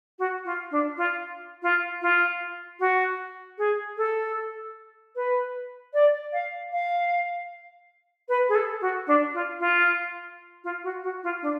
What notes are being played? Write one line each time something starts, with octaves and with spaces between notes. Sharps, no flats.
F#4
F4
D4
F4
F4
F4
F#4
G#4
A4
B4
D5
F5
F5
B4
G#4
A4
F#4
D4
F4
F4
F4
F#4
F#4
F4
D4